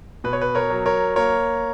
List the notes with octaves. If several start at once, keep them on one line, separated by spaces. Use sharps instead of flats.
B2 B4
C#5
B4
A#4 C#5
F#3
A#4 C#5
A#3 A#4 C#5